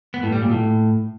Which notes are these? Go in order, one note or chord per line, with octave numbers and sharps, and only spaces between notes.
B3
A2
G3
A#2
A2